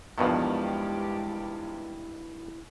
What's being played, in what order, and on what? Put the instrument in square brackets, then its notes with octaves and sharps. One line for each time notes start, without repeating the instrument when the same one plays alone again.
[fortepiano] E2 F3 [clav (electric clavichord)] G2 B2 D#3 [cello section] G#3 G4 [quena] E4